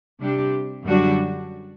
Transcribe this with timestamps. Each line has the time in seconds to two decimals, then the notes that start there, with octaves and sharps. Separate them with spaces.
0.21 C3 G3 D4 G4
0.84 F#2 D3 G3 D4 F#4